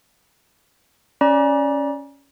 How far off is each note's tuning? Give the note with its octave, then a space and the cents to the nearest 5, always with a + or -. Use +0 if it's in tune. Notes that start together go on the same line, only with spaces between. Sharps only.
C#4 +0 D5 +0 A#5 +40